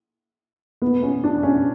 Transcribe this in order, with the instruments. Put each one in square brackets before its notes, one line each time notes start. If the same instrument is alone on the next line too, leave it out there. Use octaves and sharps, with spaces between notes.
[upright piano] B3
C#4
D4
C#4